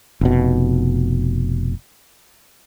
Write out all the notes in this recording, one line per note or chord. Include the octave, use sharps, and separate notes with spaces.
F1 B2